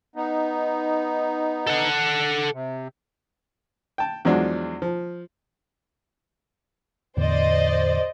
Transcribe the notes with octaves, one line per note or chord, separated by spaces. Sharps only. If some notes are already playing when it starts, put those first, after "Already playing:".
B3 D#4
A4 F#5
C3
G5 A5
E2 F3 F#3 G#3 D4
F3
E2 A2 D3 C5 D5 D#5